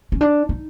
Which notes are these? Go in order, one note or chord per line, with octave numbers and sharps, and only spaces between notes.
C#4
D4
D#4